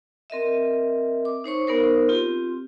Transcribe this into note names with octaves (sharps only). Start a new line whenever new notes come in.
C4 A#4 D#5 E5
D6
D#4 C5 C#5 C#6
B3 D#4 A#4 C5
C4 F4 G4